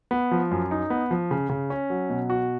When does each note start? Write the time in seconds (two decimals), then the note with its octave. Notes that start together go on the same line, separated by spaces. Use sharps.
0.11 B3
0.31 F3
0.51 F#2
0.71 D#4
0.90 B3
1.11 F3
1.31 C#3
1.50 C#3
1.70 C#4
1.90 F#3
2.10 B2
2.30 F#4